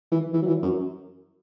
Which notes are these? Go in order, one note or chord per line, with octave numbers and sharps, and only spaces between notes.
E3
E3
F#3
E3
F#2